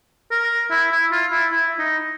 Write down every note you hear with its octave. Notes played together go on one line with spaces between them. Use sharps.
A#4
E4
E4
F4
E4
E4
D#4